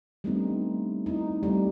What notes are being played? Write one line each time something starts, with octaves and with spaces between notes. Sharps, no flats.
G3 A3 B3 C4 D4 D#4
D#4 E4
G3 A3 B3 C4